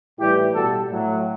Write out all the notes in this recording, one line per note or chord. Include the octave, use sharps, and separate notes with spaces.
A2 E3 G3 E4 G4
B2 G3 F#4 A4
A2 F#3